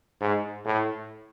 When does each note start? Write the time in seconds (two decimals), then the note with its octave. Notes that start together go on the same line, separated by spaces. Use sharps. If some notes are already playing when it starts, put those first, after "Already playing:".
0.21 G#2
0.65 A2